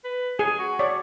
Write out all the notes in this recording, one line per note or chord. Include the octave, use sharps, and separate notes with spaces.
B4
G#4 G#5
F#4
C#5 D5